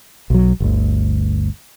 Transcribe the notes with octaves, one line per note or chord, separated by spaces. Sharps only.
B1 F#3
G1 D2